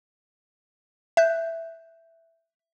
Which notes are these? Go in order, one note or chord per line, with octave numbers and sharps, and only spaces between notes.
E5 F#6 G6